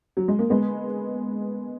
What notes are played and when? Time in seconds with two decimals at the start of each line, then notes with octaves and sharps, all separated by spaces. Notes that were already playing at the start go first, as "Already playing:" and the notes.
0.17 F#3
0.28 G#3
0.39 A#3
0.50 G#3 B3